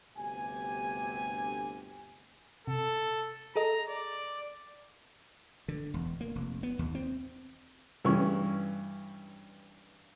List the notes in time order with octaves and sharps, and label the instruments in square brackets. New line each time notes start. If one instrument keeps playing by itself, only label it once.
[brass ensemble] G1 D2 C3 G4 G#5
[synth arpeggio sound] C3 [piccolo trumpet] A4
[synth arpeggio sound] G#4 A4 D#5 [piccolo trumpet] A#5
[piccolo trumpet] D5
[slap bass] D3
E1
A#3
F1
B3
D#2
C4
[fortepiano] G2 E3 C#4 C#6